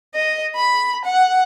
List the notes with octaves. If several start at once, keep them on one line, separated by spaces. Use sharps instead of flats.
D#5
B5
F#5